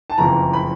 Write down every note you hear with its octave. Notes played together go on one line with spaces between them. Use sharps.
A5
F#1 F2 C#3 E3 A#5
B5